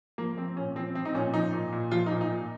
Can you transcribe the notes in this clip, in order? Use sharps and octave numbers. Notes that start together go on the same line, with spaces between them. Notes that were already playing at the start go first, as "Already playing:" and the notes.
F3 A#3
F3 C4
A#2 C#4
F3 C4
F3 C4
D#4
A#2 C#4
F3 D#4
A#2
A#2
F3 F4
D#4
A#2
D#4
A#2